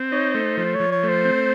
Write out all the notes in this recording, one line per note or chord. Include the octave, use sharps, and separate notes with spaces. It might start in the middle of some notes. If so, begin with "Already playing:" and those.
Already playing: C4
D#4 C#5
A3 C5
F3 C5
C#5
F3
C#5
A3 C5
C4